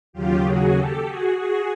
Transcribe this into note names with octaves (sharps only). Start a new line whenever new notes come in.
D#2 C#3 F#3 F4 G4
F#4 G#4
G4 A4
F#4 G#4
F#4 G#4